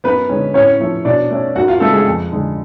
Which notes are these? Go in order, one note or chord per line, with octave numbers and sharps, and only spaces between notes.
F#2 B3 B4
D3 G#3 C#4
A2 C#4 C#5
F3 A3 C#4
B2 D4 D5
A3 C#4
F#2 F#4 F#5
F4 F5
C#3 G#3 A3 B3 A4
G#3 G#4
F2
D3 G#3